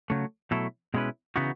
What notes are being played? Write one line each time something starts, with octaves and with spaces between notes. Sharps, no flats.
C#3 F#3 A3
B2 F#3 A3 E4 A4
B2 G#3 C#4 E4 B4
C#3 E3 B3 D#4 F#4